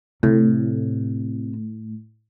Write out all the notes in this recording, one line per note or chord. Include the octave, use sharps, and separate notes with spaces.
A2 C3